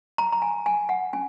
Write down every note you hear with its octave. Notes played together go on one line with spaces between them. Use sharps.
A#5
A#5
G#5
G#5
F#5
C#4 G#5